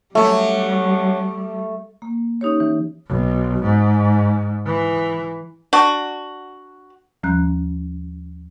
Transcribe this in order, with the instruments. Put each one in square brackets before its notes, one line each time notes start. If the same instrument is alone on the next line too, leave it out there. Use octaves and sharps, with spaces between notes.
[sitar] F#3 C#4 [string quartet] G3 [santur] A3
[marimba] A#3
C#4 D#4 G4 C#5
E3
[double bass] B1
G#2
E3
[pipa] D4 F#4
[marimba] D#2 F3 G3 C#4 A#5 F#6